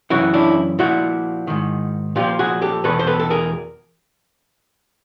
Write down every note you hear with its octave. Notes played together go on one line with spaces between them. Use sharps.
F#2 C#3 E3 E4 F#4
D4 E4
A#2 F3 E4 F#4
G#2 D#3
A#2 F3 F4 G4
F#4 G#4
G4 A4
E2 B2 A4 B4
C5
A4 B4
A4
G#4 A#4